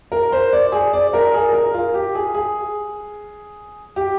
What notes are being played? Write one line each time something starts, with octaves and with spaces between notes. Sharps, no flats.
A#4
C5
D5
G#4
D5
A#4
G#4
A#4
F4
G4
G#4
G#4
G4